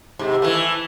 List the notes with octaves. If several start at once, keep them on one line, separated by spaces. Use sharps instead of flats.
G#2 C3
E3 A3